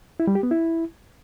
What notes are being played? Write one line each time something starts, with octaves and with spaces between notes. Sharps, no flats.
E4
G3
G4
B3
E4